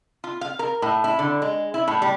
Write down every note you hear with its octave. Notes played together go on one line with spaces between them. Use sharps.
F4
F5
A#4
A2
E4
D3
G#3
E4
A2
G3